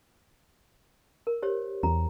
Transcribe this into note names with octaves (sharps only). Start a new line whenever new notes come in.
A#4
G4 C5 C#5
E2 A#5